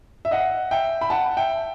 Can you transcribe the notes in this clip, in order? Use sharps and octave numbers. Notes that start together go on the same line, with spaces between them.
E5
D#5 F#5
E5 G5
B5
F#5 A5
E5 G5